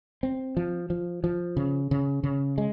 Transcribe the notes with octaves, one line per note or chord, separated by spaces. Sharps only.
C4
F3
F3
F3
C#3
C#3
C#3
G#3